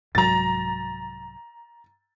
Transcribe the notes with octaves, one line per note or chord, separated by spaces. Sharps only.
C2 G#2 F#3 A#5 A6